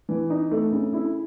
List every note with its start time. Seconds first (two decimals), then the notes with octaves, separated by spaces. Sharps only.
0.09 E3
0.30 D#4
0.51 A3
0.72 C#3
0.93 E4